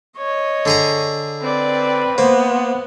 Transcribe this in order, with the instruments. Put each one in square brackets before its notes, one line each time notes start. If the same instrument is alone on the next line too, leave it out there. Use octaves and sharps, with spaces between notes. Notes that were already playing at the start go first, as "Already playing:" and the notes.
[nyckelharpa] C#5 D#5
[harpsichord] D3 G#4 A#5
[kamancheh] C4 D5 [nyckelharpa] B4
[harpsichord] A#3 [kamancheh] B3 [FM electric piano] C5